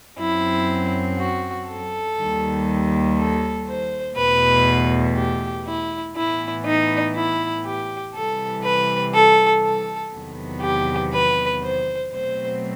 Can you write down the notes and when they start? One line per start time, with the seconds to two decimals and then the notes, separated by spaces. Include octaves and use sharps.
0.18 F#2 F#3 C4 E4
1.18 F#4
1.68 A4
2.17 D#2 D#3 G3
3.16 A4
3.67 C5
4.16 E2 B2 A3 B4
5.15 G4
5.66 E4
6.15 A2 E3 B3 E4
6.65 D#4
7.15 E4
7.64 G4
8.14 C3 E3 G3 A4
8.64 B4
9.14 A4
9.63 A4
10.12 E2 C3 D#3 F#3 B3
10.62 G4
11.13 B4
11.62 C5
12.12 B2 F#3 A3 C4 C5